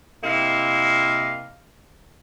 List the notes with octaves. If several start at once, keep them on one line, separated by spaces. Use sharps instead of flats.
C3 A#3 E4 D#5 F5